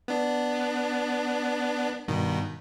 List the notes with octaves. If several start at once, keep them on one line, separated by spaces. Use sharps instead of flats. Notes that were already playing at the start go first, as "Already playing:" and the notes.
B3 D4
G2 B2 D#3